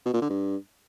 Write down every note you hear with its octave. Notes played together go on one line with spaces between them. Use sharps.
B2
A#2
D3
G2